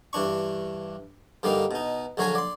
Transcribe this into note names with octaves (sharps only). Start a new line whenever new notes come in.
G2 E3 D4 C#6
G2 D3 G3 A#3 D#4 F5
B2 D#4
A#1 D3 F#3 C#5 F5 G#5
D5 C6